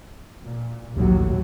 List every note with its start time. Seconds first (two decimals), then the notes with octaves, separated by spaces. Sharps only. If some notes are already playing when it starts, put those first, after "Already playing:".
0.44 A#2
0.97 A#1 D#2 A2 F#3